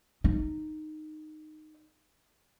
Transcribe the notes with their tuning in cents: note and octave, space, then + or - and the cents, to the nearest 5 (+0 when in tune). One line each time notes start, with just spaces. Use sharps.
D#4 -10